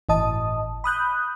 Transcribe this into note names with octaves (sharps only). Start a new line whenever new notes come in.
G1 A2 E3 D#5 A5 D#6
B5 D#6 F#6 G6